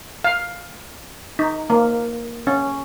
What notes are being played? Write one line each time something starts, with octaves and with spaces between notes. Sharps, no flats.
F5
D#4
A#3
C#4